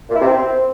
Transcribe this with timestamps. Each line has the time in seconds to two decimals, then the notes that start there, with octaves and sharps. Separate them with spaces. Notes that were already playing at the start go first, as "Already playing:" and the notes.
0.09 A#2
0.15 E4
0.21 C3
0.27 C4